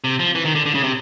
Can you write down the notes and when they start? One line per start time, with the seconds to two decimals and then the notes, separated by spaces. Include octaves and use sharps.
0.04 C3
0.19 F3
0.35 E3
0.45 D#3
0.55 D3
0.66 D3
0.74 C#3
0.83 C3